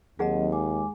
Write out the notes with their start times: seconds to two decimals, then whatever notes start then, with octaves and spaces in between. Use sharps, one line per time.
0.19 D#2 F#3 C4 D#4 G#4 D#5 F#5
0.52 G#3 G#5 D6